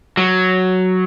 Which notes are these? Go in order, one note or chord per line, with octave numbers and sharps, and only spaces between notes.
F#3